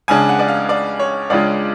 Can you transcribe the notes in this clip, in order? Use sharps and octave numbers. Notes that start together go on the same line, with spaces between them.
C#2 C#3 G#3 D4 G#5
F#5
D5
F5
D5
C#5
C#2 C#3 G#3 D4 F4 D5